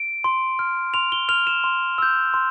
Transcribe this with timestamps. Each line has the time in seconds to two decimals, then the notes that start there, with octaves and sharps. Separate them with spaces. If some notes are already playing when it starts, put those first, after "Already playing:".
Already playing: D7
0.24 C6
0.59 F6
0.94 C6 F7
1.12 G7
1.29 F6 F7
1.47 E7
1.64 C6
1.98 E6 G6
2.34 C6